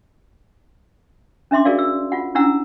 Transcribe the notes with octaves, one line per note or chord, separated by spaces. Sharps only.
C#4 D4 E5 C6 D6
F#4 G#4 A#4 D5 F5
E6
F4 F#5
C#4 D4 E4 F#5 A#5 E6